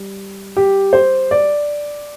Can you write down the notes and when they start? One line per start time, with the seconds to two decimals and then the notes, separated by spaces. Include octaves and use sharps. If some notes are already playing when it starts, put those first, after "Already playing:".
Already playing: G3
0.57 G4
0.93 C5
1.31 D5